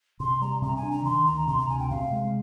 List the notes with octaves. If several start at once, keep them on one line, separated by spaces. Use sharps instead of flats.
C3 C6
G3 A#5
C3 A#5
G#5
D4
A#5
D#3 C6
D2 A#5
C3 C6
A#5
D2 G#5
G5
C3 F5
G#3